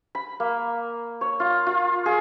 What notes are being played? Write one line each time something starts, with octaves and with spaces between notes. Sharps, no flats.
B5
A#3
C#5
F4
F4
G#4